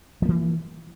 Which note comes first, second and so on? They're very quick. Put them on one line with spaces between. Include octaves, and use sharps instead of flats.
F3 A#3 E3